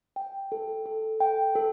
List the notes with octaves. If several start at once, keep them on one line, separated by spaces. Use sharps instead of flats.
G5
A4
A4
G5
A4